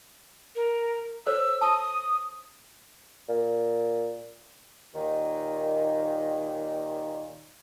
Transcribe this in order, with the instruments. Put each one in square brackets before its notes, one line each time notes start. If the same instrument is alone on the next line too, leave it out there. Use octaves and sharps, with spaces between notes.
[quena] A#4
[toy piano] A4 C5 C#5 [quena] E6
[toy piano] A5 [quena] D#6
[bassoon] A#2
[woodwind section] D#2 A#2 D#3